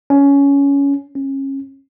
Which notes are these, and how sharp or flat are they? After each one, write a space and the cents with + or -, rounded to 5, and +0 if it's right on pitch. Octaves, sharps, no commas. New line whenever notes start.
C#4 +15
C#4 -30